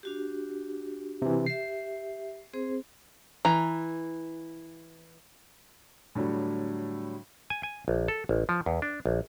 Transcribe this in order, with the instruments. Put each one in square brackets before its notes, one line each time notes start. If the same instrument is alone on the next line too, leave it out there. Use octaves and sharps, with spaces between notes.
[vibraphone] D4 F#4 G4
[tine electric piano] C3 E3
[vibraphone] G4 E5 [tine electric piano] C7
[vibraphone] C4 G#4 C5
[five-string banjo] E3 A#5
[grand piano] A2 D3 F#3 G3
[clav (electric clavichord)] G#5
G#5
A#1
A4
A1
F3
E2
D4
A#1